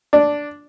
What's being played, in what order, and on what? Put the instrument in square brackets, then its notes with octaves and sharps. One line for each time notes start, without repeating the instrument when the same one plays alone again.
[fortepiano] D4